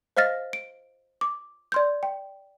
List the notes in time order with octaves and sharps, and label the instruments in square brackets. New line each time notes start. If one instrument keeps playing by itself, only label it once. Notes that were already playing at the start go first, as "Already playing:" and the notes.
[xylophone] C5 D#5 F5 F6 A6 A#6
D7
D6
D5 C6 G6
G5